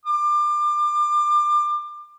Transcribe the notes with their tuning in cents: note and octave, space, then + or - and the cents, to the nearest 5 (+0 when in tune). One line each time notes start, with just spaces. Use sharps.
D6 +30